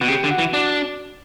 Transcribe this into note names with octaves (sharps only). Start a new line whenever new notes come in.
B2 F#4
C#3 G4
D3
F#4
E3
D4 F#4